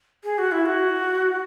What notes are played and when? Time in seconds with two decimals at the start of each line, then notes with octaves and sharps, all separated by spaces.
0.24 G#4
0.38 F#4
0.52 E4
0.66 F#4